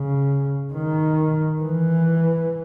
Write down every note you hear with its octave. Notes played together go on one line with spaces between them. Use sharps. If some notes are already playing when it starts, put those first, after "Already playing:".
Already playing: C#3
D#3
E3